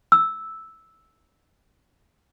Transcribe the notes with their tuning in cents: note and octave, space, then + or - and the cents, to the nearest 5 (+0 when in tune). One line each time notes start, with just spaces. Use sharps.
E6 -5